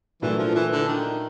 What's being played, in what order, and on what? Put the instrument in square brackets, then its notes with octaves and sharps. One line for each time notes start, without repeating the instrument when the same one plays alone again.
[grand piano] A#2 F#3 A3 D4 F#4 [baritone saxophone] E3
[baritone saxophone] F3
E3
D3
D#3